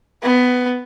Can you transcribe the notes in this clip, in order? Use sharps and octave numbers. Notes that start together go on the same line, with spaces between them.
B3